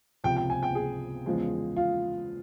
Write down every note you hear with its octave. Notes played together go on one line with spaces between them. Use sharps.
C#2 C3 F3 G5
G5
G#5
G5
G#4
E2 C#3 F3 G#3
F4